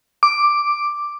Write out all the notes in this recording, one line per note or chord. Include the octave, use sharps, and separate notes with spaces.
D6